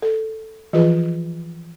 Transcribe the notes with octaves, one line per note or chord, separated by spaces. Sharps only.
A4
E3 F3 F4 G#4 B4